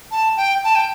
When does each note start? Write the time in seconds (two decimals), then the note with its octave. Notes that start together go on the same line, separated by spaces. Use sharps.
0.11 A5
0.37 G5
0.64 A5
0.75 G5